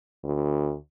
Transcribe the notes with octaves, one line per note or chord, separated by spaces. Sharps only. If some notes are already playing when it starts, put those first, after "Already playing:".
D2